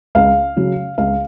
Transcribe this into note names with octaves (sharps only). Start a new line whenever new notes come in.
C#2 F5
C#3 F#3
C#2 F5